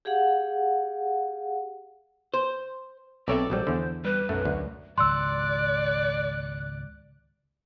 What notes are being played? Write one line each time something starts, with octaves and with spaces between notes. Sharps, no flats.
G4 G#4 F5 F#5
C5
B1 C4 A4 C#5 D5 E5
A#1 F#3 G3 C5
E2 D3
G3 B4
B1 F#2 A3
D2
G#1 C#2 D5 C6 E6 F#6